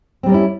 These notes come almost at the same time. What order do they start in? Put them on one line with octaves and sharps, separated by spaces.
C4 G3 A#4 C#4 E4